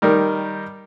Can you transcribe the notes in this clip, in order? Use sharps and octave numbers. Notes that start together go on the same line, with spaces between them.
D#3 G3 A#4